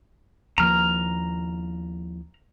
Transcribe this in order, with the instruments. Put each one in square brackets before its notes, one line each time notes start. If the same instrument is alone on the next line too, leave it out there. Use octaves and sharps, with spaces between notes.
[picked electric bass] D#2 F3 A#3 [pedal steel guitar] A#5 F6